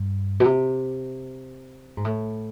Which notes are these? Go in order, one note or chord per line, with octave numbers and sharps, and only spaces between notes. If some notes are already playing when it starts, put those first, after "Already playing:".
Already playing: G2
B2
C3
G#2
A2